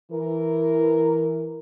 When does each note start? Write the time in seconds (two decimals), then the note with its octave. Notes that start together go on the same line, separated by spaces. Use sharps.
0.11 E3 A#4